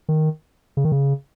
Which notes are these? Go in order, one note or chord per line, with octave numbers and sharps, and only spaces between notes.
D#3
C#3
D#3
C#3